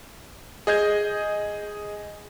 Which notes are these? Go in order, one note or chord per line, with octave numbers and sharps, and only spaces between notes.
G#4 D#5 G6 G#6